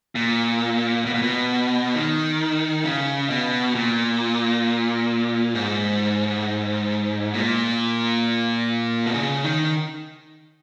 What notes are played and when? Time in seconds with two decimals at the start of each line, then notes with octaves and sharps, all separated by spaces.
0.15 A#2
1.06 B2
1.14 A#2
1.22 B2
1.95 D#3
2.85 C#3
3.30 B2
3.75 A#2
5.55 G#2
7.34 A#2
9.06 B2
9.14 C#3
9.44 D#3